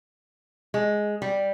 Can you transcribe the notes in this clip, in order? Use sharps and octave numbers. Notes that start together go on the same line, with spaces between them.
G#3
G3